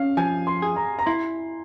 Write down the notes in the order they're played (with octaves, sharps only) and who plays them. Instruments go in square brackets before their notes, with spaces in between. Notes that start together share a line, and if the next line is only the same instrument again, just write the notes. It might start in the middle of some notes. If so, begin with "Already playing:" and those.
Already playing: [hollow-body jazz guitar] C#4 [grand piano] F5
[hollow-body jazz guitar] F3 [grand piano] G#5
[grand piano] C6
[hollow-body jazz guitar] G#4
[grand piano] A#5
A#5
[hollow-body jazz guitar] E4 [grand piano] C6